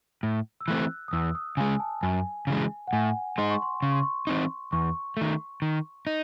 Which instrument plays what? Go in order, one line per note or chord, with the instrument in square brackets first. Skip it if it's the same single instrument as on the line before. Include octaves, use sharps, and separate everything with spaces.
[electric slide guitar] A2
[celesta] E6
[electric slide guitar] E3 A3 C4 [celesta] F#6
[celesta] D#6
[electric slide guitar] E2 [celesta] E6
[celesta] D#6
[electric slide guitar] C#3 G#3 [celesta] G#5
[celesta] A5
[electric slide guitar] F#2 [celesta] G#5
[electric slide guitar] C#3 E3 G#3
[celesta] F#5
[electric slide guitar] A2 [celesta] G#5
[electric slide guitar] G#3 D#4 [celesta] C6
[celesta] C#6
C6
[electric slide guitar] C#3 [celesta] C#6
[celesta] C6
C#6
[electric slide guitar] E3 C4 D#4
[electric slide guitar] E2 [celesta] C#6
[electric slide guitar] D#3 A3
D#3
D#4